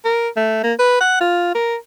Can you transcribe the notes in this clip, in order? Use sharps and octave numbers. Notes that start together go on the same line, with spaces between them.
A#4
A3
A#3
B4
F#5
F4
A#4